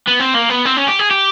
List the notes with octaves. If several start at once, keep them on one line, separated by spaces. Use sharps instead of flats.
B3
C4
A#3
B3
C4
C#4
G4
G#4
G4